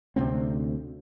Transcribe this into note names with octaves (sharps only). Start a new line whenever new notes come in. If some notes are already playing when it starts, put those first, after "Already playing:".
D2 C3 B3 C4